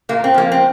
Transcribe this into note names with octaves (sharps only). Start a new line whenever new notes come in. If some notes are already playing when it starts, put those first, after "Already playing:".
A#2 A#3
C4
F3 A#3
C4